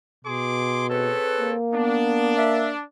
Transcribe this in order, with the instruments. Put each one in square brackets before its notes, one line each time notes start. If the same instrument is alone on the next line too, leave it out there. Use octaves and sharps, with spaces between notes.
[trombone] B2 [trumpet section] G#4 C6 D6
[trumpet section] C4 A4 C#5 [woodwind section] G#4 B4
[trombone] A#3
[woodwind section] B3 [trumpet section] D4
[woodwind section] E5